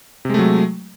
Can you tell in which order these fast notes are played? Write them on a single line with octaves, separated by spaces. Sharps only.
C3 G#3 A3 F#3